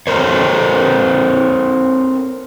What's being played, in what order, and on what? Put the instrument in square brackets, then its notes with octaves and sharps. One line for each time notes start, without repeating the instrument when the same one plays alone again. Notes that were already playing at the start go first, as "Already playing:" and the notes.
[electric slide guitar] C4 A4 A#4 C5 C#5